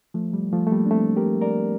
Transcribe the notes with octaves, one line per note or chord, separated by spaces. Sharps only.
F3 A3
G3
F3 A3
A3
G3 A#3
D4
A3 C4
G4 A#4
A#4 D5